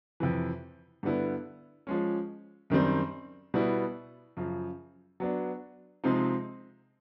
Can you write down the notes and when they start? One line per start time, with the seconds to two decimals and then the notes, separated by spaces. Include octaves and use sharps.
0.20 F2 C3 E3
1.03 G2 D3 G3 B3 E4
1.87 F3 G#3 C#4
2.70 F#2 D#3 G3 C4
3.54 B2 G3 B3 E4
4.37 F#2 C#3 F3
5.20 F#3 B3 D4
6.04 C3 F3 G#3 C4 D#4